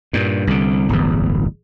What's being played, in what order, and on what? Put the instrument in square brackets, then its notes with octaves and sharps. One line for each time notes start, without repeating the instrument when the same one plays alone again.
[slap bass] G2 A#2
C2 D3
D1 G1 E2